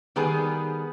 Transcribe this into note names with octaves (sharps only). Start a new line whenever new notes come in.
D#3 G3 B3 G#4 B4